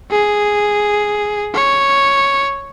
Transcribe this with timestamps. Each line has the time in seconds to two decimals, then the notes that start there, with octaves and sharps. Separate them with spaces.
0.11 G#4
1.55 C#5